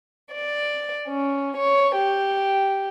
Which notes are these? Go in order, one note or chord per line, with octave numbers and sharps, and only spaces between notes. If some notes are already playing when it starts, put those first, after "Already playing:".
D5
C#4
C#5
G4